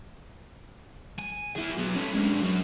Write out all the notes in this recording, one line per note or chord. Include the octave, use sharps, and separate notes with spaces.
G#5
E4 G#4
F#3 B3
C#4 A4
G#3 D4
F#2